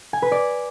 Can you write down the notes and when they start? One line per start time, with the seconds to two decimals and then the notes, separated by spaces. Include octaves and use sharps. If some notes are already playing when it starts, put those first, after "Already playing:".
0.13 G#5
0.22 B4
0.32 D5